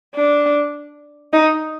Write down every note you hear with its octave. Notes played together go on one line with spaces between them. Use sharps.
D4
D#4